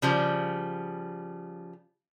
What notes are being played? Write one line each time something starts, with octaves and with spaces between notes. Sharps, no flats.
C#3 F3 G3